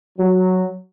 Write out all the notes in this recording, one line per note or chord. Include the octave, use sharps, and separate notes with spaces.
F#3